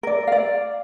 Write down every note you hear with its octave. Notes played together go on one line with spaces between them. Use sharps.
A#4 D5
D5 F5